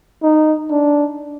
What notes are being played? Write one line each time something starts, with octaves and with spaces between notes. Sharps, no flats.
D#4
D4